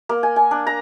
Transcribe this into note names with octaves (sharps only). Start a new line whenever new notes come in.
A#3
G#5
G#5
D4
A#5